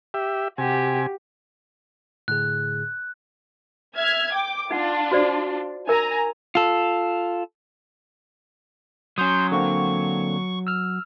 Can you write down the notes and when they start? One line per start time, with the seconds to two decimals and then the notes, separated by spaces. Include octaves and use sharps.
0.14 G4 E5
0.58 C3 F#4 G4 G#5
2.28 A2 D3 G#4 F#6
3.96 E5 F6 G#6
4.33 G5 D6
4.71 D4 D#4 F4 F#5
5.11 F#4 C5 D5
5.87 D#4 A#4 G#5 A#5
6.55 F4 A4
9.18 F#3 C#4 C6 D#6 G6
9.52 D3 A#3 C4 C#6
10.67 E6 F6